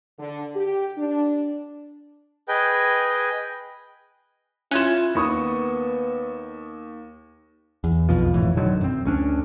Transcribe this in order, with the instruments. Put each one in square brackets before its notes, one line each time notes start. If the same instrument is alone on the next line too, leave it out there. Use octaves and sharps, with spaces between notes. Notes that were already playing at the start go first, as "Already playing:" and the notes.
[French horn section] D3
G4
D4
[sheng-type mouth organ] G#4 B4 D#5 G5
[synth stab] C#4 F4 [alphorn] E4 [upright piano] F#6 G#6 E7
[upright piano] D#2 C#6 D#6 [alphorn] B3
[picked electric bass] E2
B1 F2 B2 F3
G#1 F2 A2 E3
B2 D3 D#3 F#3
F#2 C4
D2 C#4 D4